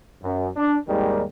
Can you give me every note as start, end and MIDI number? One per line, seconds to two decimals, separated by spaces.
0.22 0.48 42
0.56 0.76 62
0.87 1.23 32
0.87 1.23 39
0.87 1.23 51
0.87 1.23 55
0.87 1.23 56